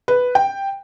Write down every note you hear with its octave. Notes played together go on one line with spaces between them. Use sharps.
B4
G5